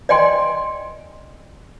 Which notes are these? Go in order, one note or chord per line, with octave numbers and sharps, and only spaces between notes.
D5 D#5 G5 G#5 C6